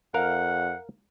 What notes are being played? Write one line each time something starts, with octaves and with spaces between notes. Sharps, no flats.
F2 A#4 F5 F#5